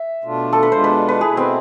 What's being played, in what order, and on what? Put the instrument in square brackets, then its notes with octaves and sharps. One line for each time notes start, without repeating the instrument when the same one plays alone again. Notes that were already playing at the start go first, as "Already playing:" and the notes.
Already playing: [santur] E5
[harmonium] B2 A3 D4 F4
[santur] A4
B4
[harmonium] B2 G#3 D4 F4 [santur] C5
[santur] B4
B4
[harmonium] B2 A3 E4 [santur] G#4
[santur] C4